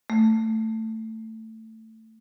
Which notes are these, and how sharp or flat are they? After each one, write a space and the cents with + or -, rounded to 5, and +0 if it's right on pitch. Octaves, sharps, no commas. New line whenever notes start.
A3 +15